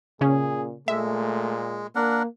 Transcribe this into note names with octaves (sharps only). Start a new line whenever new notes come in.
A#2 C#3 C#4 G#4
A#2 G#3 A3 E5
A#3 D4 A#4 F#5